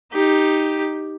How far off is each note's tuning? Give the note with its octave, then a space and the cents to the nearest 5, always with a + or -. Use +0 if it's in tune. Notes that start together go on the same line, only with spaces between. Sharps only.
D#4 +0 G4 +5